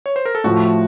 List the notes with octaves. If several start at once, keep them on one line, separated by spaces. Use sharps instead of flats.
C#5
C5
A#4
A4
A2 F3 A3 F#4